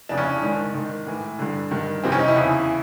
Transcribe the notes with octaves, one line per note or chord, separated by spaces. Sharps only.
F2 C#3 E3 D4
C#4
D4
G#2 D#3
G#2 D#3
A2 E3
G2 D3
G2 D#3
F2 C3 E3 C4
C#4
D#4
E4
E2 C#3 E3